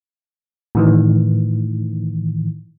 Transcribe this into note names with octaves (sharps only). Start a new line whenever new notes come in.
A2 D#3 E3